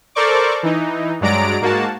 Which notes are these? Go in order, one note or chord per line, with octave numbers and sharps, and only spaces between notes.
A4 A#4 C5 D5 C#6 D6
E3 D#4
G2 F#3 G#3 D5 A#5 D7
G#2 A#3 F#4 A5